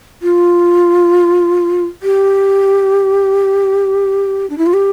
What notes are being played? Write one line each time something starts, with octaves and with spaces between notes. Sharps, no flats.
F4
G4
D4
E4
F4
G4